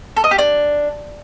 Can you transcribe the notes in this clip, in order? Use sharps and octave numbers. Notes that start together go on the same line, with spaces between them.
A4
D#5
G4
D4